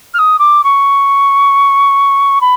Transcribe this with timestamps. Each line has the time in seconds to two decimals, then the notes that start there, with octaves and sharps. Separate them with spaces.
0.14 F6
0.18 D#6
0.39 D6
0.64 C#6
2.41 B5